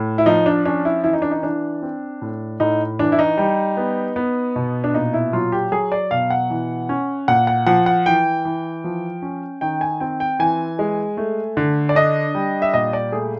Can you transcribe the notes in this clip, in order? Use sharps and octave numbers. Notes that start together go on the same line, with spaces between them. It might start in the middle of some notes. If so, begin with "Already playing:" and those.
Already playing: A2
E4
F3 D#4
D4
C#4 D4
E4
E3 E4
D#4
D4
D#4
E3 D4
C4
A2
A2 D#4
E3 D4
E4
D#4
G3
B3
B3
B2
D4
A#2 D#4
E4
F#3 F4
G4
F#3 G#4
D5
B2 F5
F#5
E3
C#4
A#2 F#5
F#5
F3 F#5
F#5
E3 G5
E3
F3
C#4
D#3 G5
G#5
C4 G5
G5
E3 G#5
G#3
A3
D3
D5
D4 D#5
G3
E5
A#2 D#5
D5
A3 G#4